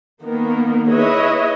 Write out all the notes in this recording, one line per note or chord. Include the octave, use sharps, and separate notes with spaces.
D#3 A#3 B3 A#4
E4 G#4 B4 C#5 D#5 E5